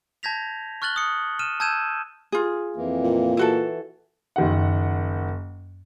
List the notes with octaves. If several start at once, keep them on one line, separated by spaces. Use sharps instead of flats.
A5 G6 G#6 A#6 B6 F7
C#6 F6 F#6 A6 F#7 G7
D#6 C#7
F6 D#7 E7
A5 E6 G6 G#6 D#7 E7
F4 G#4
F2 E3 A#3
A#2
E3 E4 F#4 A4
F#1 D#3 F#5